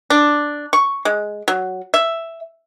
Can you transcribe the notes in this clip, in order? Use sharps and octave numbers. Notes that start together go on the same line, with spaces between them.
D4
C#6
G#3
F#3
E5